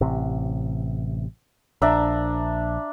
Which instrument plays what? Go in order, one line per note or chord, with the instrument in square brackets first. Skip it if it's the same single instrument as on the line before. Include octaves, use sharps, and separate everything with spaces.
[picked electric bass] A1 C3
[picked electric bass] A#1 [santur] D4 E5 A#5